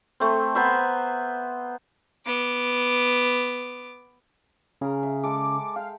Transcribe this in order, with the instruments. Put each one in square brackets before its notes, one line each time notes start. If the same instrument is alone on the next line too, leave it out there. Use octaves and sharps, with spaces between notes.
[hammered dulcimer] A3 C4
B3 C5 E5 A#5
[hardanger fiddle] B3 D6
[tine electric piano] C#3 [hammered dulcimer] G#4 A#4
[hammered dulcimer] E5
[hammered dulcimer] G#3 A4 [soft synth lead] D6
[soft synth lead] F5 [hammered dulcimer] G5